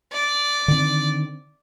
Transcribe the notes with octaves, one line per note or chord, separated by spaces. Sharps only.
D5
D3 D#3 C4